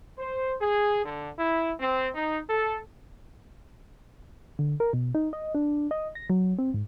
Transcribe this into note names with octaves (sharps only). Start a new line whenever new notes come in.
C5
G#4
D3
E4
C4
D#4
A4
D3
A#4
B2
D#4
D#5
D4
D#5
A#6
F#3
C4
G#2